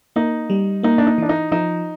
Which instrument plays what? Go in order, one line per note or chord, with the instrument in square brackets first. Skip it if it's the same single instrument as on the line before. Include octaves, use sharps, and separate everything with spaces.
[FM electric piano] A#3 [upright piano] D#4
[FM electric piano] G3
[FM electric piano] A#3 [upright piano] D#4
[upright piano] D4
D#4
[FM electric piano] E3 [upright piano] D4
[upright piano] D#4
[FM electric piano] F3 [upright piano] D#4